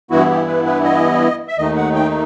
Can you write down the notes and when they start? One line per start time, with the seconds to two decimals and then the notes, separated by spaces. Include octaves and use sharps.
0.11 G2 E3 B3 E4 F#4
0.29 G4
0.48 B4
0.65 B4
0.84 D#5
1.48 E5
1.58 D#2 D#3 A3 D#4 D#5
1.76 F#5
1.95 G5